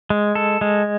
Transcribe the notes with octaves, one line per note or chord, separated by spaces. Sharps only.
G#3
A4
G#3